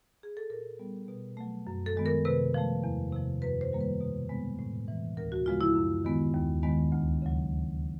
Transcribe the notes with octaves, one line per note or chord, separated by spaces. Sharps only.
G#4
A4
A#2 A#4
G3 B3
B2
F#3 A3
F#2
A4
D#3 G#3 B3
A#4
C3 B4
F3 A3
E2
C3 F3
F#2 B4
C5
D#3 G3 A#3
B4
B2
G#3 B3
A2
E3 G#3
D2 A#4
F#4
C#3 F3 G#3 B3 F4
E4
F#2
D#3 G#3 B3
D#2
D#3 G#3 B3
D2
C#3 F#3